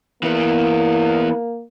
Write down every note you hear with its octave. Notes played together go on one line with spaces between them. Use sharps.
E3 A#3 B3